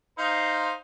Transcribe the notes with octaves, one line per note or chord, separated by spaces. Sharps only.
D#4 C5 F5